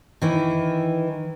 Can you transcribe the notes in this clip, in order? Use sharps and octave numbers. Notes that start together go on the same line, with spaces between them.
D#3 E3